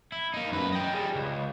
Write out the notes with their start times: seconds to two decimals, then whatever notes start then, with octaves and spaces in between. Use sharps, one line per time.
0.12 E4
0.34 A#3 D#4
0.52 F#2 B4
0.72 D#5 G5
0.92 G3 G#4
1.15 C#2